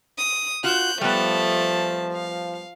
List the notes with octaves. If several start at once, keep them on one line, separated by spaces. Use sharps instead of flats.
D#6
F4 F#4 F#6 G6
F3 G3 A3 B3 A5
F5